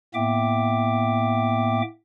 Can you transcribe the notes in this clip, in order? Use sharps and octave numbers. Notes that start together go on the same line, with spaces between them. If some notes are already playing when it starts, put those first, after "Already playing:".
A2 A#3 B3 E5 G5 D6